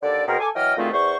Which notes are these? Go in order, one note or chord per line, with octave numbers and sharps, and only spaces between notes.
D#2 D3 A4 D5
B2 C4 G#4 A#4
A4 G#5 D6
E3 F#3 D#5 G5 F6
D2 D#3 A3 C4 F4 G#4
E2 C5 C#6